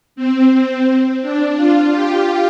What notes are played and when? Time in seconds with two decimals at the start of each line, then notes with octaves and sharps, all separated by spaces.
0.16 C4
1.22 D4
1.57 F4
1.92 G4